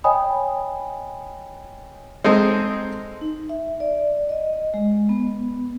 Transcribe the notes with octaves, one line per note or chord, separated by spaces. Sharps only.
C#5 D#5 G5 G#5 B5 D#6
G#3 C4 D#4 A4 C5 D#5
D#4
E5
D5
D#5
G#3
B3